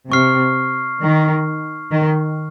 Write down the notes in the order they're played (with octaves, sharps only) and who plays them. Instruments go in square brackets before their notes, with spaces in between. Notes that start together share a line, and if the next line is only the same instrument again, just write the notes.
[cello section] C3 [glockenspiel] C#6 F6 C7
[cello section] D#3
D#3